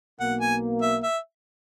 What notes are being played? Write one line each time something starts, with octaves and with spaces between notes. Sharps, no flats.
B1 B2 A#3 F#5
G#5
E5
E5